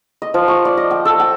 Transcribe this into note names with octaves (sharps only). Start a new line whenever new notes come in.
D#5
F3
C#6
D5
D#5
G5
A4
G5